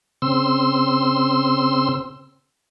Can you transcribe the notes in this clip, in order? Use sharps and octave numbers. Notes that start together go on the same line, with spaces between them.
C#3 C4 C6 E6